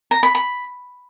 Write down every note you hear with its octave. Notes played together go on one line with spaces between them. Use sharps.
A#5
B5
B5